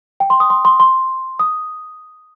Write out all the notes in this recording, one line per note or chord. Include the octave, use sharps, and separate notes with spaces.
G5
C6
D#6
C6
C6
C6
D#6